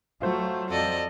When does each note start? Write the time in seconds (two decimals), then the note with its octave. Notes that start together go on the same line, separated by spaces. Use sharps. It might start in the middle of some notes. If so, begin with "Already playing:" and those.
0.22 F#3 A3 F4 C5
0.70 F2 A4 D5 D#5